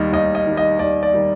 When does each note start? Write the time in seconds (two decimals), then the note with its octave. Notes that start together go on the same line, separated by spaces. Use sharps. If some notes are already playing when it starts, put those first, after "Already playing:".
Already playing: D#2 D#3 G3 D#5
0.13 D#2 D#5
0.35 D#5
0.47 D#3 G3
0.57 D#5
0.79 D#2 D5
1.03 D5
1.13 D#3 G3